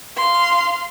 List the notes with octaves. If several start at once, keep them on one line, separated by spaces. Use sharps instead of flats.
F5 C6